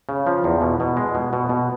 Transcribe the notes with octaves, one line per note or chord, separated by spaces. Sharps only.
C#3
F3
E2
B2
B2
G#3
B2
B2
B2